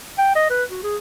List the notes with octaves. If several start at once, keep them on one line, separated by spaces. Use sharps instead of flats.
G5
D#5
B4
F#4
G#4